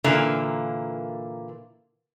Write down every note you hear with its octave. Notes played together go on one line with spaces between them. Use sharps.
A#2 D3 E3 A#3